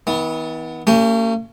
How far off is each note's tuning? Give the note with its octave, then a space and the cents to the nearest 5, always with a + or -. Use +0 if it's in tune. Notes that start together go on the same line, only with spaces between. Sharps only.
E3 -45 B3 +0
A#3 -45 C#4 +5 G4 +0